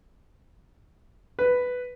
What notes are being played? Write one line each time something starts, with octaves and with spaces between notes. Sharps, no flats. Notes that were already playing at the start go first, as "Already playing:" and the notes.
B4